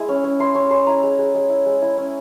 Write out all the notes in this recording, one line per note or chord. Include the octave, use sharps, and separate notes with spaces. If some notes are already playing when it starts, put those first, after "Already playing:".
Already playing: G#3 E4 G#5
C#4
C#4
E4 C6
C#4 C#6
C#4 C6
E4 A#5
G#3
G#3
G#3
E4
G#3
E4
C#4